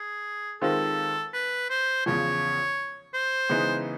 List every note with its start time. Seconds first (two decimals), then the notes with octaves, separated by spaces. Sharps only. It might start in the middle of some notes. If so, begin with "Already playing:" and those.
Already playing: G#4
0.62 D#3 G#3 C4 F4 A4
1.34 B4
1.70 C5
2.06 E2 C#3 F3 C#5
3.14 C5
3.49 C#3 E3 G#3 B3 D#4